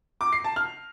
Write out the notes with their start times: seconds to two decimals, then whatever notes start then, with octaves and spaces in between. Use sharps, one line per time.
0.21 D6
0.33 C7
0.44 A5
0.56 F6